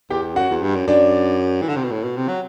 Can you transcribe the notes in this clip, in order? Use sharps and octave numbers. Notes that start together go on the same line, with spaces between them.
E2 G4 G5
F#2 F#4 F#5
E2
G2
F#2
F#2 D4 D5
E3
D3
C3
B2
A2
B2
C3
F#3